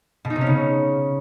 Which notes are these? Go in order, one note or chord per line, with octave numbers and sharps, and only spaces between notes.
B2
D#4
C3
C#4
C#3